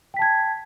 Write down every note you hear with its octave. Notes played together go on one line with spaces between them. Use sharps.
G5 A5 G#6 B6